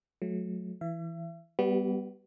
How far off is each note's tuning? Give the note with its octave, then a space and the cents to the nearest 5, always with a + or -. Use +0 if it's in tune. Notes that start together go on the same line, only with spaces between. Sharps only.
F#3 -25 A3 -35
E3 +5 E5 +40
G3 +0 B3 +0 G4 -45